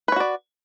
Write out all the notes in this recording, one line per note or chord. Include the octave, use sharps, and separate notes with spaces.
F#4 B4 C#5 D5